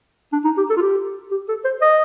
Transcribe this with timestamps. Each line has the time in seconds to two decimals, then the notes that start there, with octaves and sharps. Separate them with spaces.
0.33 D4
0.45 D#4
0.57 G4
0.70 A4
0.77 F4
0.81 G4
1.31 G4
1.49 A4
1.65 C5
1.81 D#5